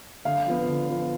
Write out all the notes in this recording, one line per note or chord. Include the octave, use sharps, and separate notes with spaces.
D3 F5
F3 B3
D3
F3 B3